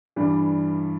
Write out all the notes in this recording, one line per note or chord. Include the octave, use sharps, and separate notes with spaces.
G2 E3 G3 D4